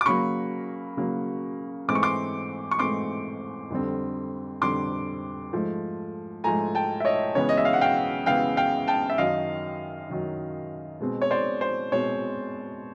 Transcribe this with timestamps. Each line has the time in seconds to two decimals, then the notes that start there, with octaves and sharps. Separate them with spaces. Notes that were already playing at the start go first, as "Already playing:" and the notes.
0.01 D6
0.06 C#3 F#3 A#3 B5 C#6
0.97 C#3 F#3 A#3
1.88 G#2 E3 A3 C4 D6
1.95 C#6
2.03 C6 D6
2.71 C#6
2.79 G#2 E3 A3 C4 C6 D6
3.70 F2 D3 G3 C4
4.62 F2 D3 G3 C4 C6 D6
5.53 G#2 F3 A3
6.44 G#2 F3 A3 G#5 A#5
6.75 G5 A5
7.00 E5
7.05 C#5 D#5
7.35 C#3 E3 G#3 B3 C#5
7.49 D#5
7.57 E5
7.65 F5
7.73 F#5
7.81 F5 G5
8.26 C#3 E3 G#3 B3 F5 G5
8.57 F5 G5
8.87 G5 A5
9.10 E5
9.18 F#2 D#3 F#3 D#5 F5
10.09 F#2 D#3 F#3
11.00 B2 G#3 C4
11.22 C#5
11.31 C5 D5
11.61 C5
11.92 B2 G#3 C4 C#5